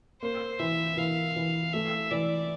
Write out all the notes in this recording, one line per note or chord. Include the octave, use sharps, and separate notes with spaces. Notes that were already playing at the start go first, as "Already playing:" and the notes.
A#3 C5
E3 E5
E3 F5
E3
A3 E5
E3 D5